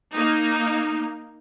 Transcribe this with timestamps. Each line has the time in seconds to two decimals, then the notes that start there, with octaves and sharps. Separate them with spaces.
0.14 A#3 D#4